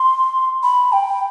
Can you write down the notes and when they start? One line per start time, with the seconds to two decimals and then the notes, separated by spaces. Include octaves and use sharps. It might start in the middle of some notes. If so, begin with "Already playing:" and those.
Already playing: C6
0.63 B5
0.93 G5